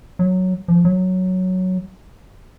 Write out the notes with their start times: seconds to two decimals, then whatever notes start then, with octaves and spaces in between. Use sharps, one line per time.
0.19 F#3
0.68 F3
0.85 F#3